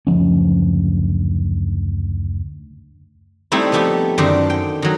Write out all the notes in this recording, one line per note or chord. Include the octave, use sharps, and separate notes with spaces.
F#1 D2 F3 C#4
G3 A3 C4 D#4 E4
F3 G3 A3 B3 G4
F#2 D3 D#3 A3 D4 C5
G5
D#3 F#3